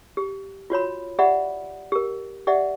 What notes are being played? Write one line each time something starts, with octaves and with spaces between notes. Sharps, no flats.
G4
F4 F#4 C#5 B5
G4 D5 E5 F#5 B5
G4 A#4
G4 D5 E5 F#5